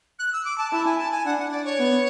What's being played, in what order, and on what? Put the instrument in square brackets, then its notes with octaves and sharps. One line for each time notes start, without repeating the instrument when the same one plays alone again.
[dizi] F#6
E6
D6
A5
[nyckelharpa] E4 [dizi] A5
[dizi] G#5
A5
G#5
[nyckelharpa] D4 [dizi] F#5
[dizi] F#5
D5
C#5
[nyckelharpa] B3